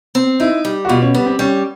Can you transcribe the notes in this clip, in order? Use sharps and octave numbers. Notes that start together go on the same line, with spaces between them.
C4
D#4 E4
G3
F#4
B2 F4
C#4
G3 B3
C4
G3 C#4